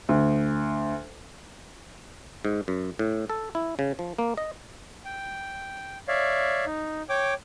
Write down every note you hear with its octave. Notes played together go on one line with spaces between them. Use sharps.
D2
G#2
F#2
A2
A4
E4
C#3
F3
A#3
D#5
G5
C#5 D5 E5 F5
D#4
C#5 G5 D6